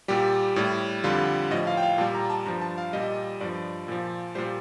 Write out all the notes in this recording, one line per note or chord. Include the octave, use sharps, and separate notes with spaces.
A#2 G3 G4
A2 G3
F2 D3 G3 F4
A2 F3 D#5
F5
G5
F5
A#2 G3 A5
A#5
A5
G2 F3 A#5
A5
F5
A#2 G3 D#5
G2 F3 D5
A#2 F3
A#2 G3 C5